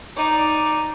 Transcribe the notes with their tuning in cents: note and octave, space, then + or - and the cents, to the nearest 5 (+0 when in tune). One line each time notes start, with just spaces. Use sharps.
D#4 +0 D5 +0